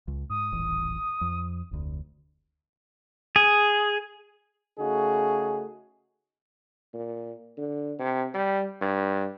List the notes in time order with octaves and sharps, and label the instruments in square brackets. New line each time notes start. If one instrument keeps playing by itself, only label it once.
[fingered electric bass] C#2
[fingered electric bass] G#2 [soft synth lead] D#6
[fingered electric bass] D#1 A1 E3
F2
F1 D2
[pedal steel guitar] G#4
[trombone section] C#3 A3 D#4 F#4 G#4
[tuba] A#2
D3
C3
G3
G2